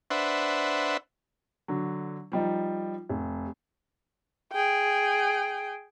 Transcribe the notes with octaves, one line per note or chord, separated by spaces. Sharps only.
D4 B4 C5 E5 F#5
D3 F#3
F3 G3 D#4
F1
G#4 G5